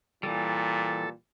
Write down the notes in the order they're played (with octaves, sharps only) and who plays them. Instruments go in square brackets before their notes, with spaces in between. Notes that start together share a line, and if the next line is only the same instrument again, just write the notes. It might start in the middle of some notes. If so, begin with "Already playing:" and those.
[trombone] A#2 [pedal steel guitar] E3 G3 [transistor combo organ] A4